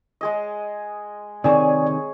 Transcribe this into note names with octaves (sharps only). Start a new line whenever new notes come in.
G#3 G#4 D#5
C3 D#3 C4 G#4 C#5 D5 G#5